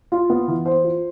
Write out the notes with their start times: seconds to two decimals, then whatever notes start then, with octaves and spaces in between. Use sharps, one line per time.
0.12 F4
0.30 B3
0.48 E3
0.66 C5
0.84 F4